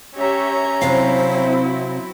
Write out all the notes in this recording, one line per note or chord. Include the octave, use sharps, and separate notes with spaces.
C#4 G4 C#5 E5 A#5
C3 F#3 C4 E4 C5 F5